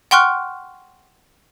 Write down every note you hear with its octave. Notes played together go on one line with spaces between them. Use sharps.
F#5 G5 C6 C#6 F6 F#6